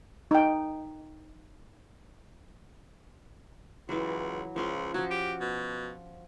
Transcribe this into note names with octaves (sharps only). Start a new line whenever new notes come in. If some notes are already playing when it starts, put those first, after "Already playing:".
D#4 G5
C#2 E3 F#3
C#2 F3 C#4 C6
F3 F#3 F#4
G4
B2